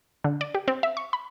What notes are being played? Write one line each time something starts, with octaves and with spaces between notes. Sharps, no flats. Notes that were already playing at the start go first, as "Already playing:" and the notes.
D3
D5
G4
C4
E5
C#6
B5